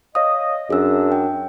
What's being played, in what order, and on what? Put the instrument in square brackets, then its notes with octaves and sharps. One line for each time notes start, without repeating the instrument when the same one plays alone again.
[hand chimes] C#5 F5 D#6 [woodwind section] D#5
[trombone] F#2 [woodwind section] D4 [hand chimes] G#4 E6
[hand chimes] G5